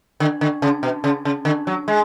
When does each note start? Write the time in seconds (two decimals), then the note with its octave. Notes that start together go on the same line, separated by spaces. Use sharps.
0.20 D3
0.41 D3
0.62 C#3
0.83 B2
1.04 C#3
1.25 C#3
1.45 D3
1.67 F#3
1.88 G#3